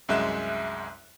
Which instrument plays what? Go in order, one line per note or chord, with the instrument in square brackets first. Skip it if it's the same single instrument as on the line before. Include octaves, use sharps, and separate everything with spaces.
[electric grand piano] C2 F#2 G#3 E5 F#6 E7